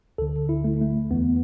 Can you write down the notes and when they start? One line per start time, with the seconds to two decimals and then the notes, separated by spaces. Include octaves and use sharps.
0.18 D2 D3 A4
0.49 E4
0.64 A3
0.81 A3
1.11 E2 E3 B3